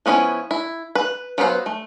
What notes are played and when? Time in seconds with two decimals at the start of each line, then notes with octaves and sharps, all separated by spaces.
0.06 F3 B3 C#4 D#4 E4
0.51 E4
0.95 B4
1.38 F#3 B3 B4 C5 F5
1.66 A3